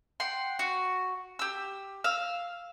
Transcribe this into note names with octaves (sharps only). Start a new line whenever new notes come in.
F#5 G5 C6
F#4
G4 E6
F5 E6